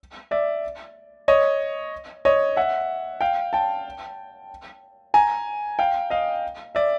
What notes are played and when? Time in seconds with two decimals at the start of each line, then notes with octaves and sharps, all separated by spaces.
0.31 D5 E5
1.28 C#5 D#5
2.25 C#5 D#5
2.56 E5 F#5
3.21 F5 G5
3.53 G5 A5
5.14 G#5 A#5
5.79 F5 G5
6.10 D#5 F5
6.75 D5 E5